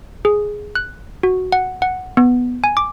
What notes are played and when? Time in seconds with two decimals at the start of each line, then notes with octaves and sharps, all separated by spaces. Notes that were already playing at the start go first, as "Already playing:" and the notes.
0.25 G#4
0.75 F#6
1.23 F#4
1.52 F#5
1.82 F#5
2.17 B3
2.64 G#5
2.77 D6